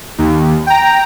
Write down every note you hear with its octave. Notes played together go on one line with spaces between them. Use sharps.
D#2
G5 A#5